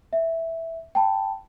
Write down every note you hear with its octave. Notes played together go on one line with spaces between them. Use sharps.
E5
G5 A5 B5